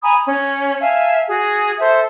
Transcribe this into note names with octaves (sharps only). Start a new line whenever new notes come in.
G#5 A#5 B5 D#6
C#4
E5 F5 G#5 A5
F#4 G#4
A4 C5 E5